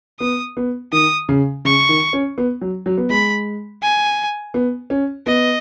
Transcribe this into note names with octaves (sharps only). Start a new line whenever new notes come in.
B3 D#6
B3
D#3 D#6
C#3
C#3 C#6
D#3
C#4
B3
F#3
F#3
B3
G#3 B5
G#5
B3
C#4
B3 D#5